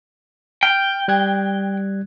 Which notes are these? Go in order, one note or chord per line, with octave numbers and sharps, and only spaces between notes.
G5 F6
G3 F#6 G#6